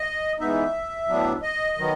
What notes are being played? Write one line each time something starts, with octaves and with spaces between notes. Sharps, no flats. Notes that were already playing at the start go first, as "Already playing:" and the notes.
Already playing: D#5
E3 G#3 B3 D#4 E5
A2 F#3 B3 D4
D#5
D#3 F#3 B3